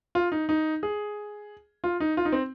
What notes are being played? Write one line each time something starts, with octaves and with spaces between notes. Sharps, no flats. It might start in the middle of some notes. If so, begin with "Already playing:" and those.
F4
D#4
D#4
G#4
F4
D#4
F4
D#4
C4